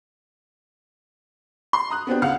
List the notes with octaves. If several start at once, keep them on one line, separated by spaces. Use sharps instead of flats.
C6
A#5 D#6 F#6
B3 C4 D4 G4
C#2 F5 F#5 F6